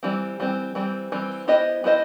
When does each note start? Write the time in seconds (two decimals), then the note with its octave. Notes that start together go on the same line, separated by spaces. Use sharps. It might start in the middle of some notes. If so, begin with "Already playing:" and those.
0.03 E3 G3 C4
0.40 E3 G3 C4
0.75 E3 G3 C4
1.12 E3 G3 C4
1.48 B3 E4 G4 C5 D#5
1.84 B3 E4 G4 C5 D#5